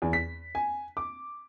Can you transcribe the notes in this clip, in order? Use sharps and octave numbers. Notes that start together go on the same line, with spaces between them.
E2
B6
G#5
D6